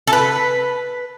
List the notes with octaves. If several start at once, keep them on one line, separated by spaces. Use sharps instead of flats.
A4
B4